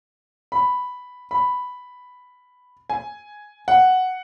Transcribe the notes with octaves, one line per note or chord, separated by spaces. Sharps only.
B5
B5
G#5
F#5